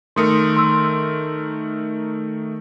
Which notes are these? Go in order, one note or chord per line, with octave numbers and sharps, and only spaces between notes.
D#3 A3 A#4 C6 D#6 C#7
C6 E6